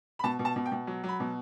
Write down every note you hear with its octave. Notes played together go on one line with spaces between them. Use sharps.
B5
B2 A5
B2
A5
B2
G5
B2
F#3
F#3
B5
B2